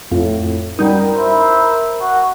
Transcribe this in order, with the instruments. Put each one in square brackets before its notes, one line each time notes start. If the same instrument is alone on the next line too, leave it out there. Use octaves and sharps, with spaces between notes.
[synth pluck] F2 [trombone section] A2
[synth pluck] F#2 G3 D#4 [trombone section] A#4
[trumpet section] E4 C5 E5
F#4